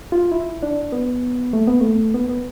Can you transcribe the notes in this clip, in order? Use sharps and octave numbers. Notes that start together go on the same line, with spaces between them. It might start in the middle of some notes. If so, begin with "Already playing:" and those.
F4
E4
D4
B3
A3
B3
A3
B3
B3